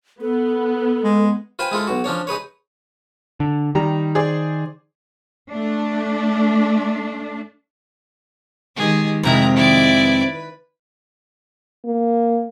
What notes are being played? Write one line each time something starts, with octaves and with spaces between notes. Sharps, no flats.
B3 A4
G#3
F4 B4 C5 G5 G#5
G#3 E4 F4 A4
B1 F#4
F3 C#4 D4 C#5
D#4 G#4 B4 C#5
D3
D#3 G3 A#5
G#4 C5 D5
A3 D4
D#3 G#3 G4 G#4
F2 C3 G#3 C4 E4 A#4 A#5
D#3 E4 D5
B4
A#3